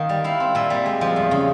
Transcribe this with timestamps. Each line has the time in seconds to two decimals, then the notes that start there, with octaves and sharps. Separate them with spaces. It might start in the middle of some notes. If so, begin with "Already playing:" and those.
Already playing: D#3 A#3
0.09 G3
0.24 E4 F5
0.40 C4
0.55 A#2 E5
0.70 G3
0.86 G#3
1.01 F3
1.16 E2
1.31 C#3